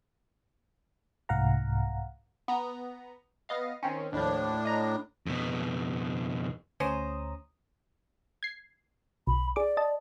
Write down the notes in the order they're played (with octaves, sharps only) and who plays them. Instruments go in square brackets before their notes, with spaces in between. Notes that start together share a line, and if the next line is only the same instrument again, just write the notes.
[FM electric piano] C2 G#2 F5 F#5 A#5
[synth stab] B3 A#5
B3 D#5 F5
D#3 C4 C#4
[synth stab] D#2 F3 [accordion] A2 D4
[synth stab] D#5 A#5 A#6
[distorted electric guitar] F2 B2
[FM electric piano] D2 A#5 D#6 [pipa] C#4 G#4 C5
[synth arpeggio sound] G#6 C7
[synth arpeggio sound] B1 [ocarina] B5
[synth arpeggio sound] G#4 D6 [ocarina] D5
[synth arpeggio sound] D#5 A5